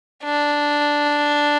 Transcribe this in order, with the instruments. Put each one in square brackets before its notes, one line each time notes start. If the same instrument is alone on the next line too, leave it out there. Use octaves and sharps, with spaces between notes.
[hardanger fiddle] D4